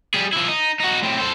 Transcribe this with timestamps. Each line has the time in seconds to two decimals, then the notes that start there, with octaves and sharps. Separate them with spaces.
0.14 G3 G#4
0.33 F3 E4
0.48 D#4
0.80 D#4 F#4
1.02 A2 C4
1.19 A4 C5